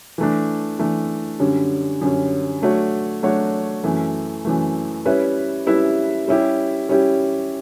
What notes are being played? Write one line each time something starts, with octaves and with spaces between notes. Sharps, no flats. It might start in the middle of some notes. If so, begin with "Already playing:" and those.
E3 A3 D4
E3 A3 D4
F#2 D3 G3 C#4
F#2 D3 G3 C#4
F#3 A3 D4 F#4 C#5
F#3 A3 D4 F#4 C#5
F#2 E3 A3
F#2 E3 A3
G3 C#4 E4 B4 E5
G3 C#4 E4 B4 E5
G3 C#4 E4 G4
G3 C#4 E4 G4